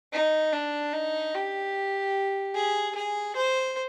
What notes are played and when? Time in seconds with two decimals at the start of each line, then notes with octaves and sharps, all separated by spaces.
0.13 D#4
0.53 D4
0.93 D#4
1.34 G4
2.55 G#4
2.95 G#4
3.36 C5